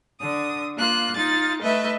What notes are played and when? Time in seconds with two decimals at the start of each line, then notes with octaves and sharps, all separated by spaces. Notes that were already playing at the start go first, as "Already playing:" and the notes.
0.19 D3 D#6
0.77 A#3 F4 F#6
1.16 D#4 F4 A6
1.62 A3 B4 D#5 E5